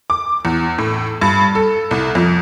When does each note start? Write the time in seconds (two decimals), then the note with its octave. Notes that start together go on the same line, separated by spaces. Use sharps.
0.10 D6
0.45 E2
0.78 A2
1.21 G2
1.55 A4
1.91 C2
2.15 F2